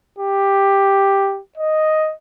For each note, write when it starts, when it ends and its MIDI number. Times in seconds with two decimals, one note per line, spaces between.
0.19 1.40 67
1.58 2.14 75